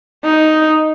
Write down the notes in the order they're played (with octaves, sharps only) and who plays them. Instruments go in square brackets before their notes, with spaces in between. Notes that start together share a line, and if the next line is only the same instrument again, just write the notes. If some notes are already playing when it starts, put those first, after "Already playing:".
[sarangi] D#4